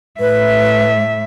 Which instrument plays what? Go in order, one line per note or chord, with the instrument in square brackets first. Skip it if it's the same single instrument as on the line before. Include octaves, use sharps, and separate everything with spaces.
[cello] A2 E5 [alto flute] B4